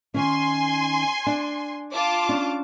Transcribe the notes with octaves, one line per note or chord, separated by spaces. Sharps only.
D#3 C#4 G#5 C6
D4
F4 A5 D6
C#4 D4